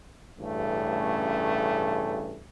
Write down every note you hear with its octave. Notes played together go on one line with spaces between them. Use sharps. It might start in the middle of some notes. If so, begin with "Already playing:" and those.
A1 G2 C#3 A3